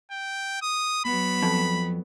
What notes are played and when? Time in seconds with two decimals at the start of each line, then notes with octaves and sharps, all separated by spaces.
0.11 G5
0.62 D#6
1.05 F#3 B3 B5
1.43 F2